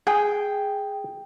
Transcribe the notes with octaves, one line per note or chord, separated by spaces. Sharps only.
G#4 G5